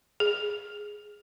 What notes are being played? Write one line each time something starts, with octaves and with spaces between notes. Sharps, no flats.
G#4